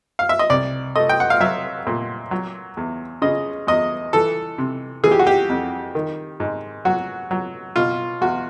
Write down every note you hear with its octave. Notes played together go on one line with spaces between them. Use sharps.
F5
E5
D#5
C2 D5
A3 D#5
G5
F#5
F5
F#3 E5
A#2
F#3
E2
C#3 D#5
E2 D#5
E3 A4
C3
E3 G#4
G4
F#4
G4
F2
D#3
G#2
F#3 F#4
F#3
B2 F4
E2 F#4